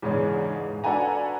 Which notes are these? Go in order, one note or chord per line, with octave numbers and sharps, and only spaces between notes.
E2 G#2 C#3 G#3 C#4 D4
G#2
D4 F#4 A4 B4 G#5 A#5